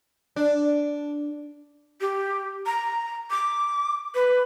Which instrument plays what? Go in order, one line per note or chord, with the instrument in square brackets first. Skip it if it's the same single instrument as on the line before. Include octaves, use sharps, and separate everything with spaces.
[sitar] D4
[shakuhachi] G4
A#5
D6
B4